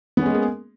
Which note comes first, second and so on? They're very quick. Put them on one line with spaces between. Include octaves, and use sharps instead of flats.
B3 C#4 G#3 A#3 G#4